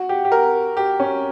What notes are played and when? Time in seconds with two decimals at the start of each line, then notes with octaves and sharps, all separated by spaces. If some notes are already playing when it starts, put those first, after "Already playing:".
Already playing: F#4
0.09 G4
0.25 G4
0.32 A#4
0.77 G4
1.00 C#4